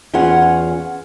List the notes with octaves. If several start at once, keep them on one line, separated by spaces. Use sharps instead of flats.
E2 C#4 F4 G#4 F#5